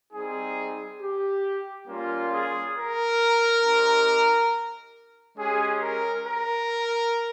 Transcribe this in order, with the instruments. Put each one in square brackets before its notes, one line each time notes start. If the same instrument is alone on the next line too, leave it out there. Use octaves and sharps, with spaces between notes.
[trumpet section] G3 C4 D#4 G#4
G4
G3 A#3 C#4 F4
G#4
A#4
C4 D#4 G4
G#3 C#4 G4 G#4
A#4
A#4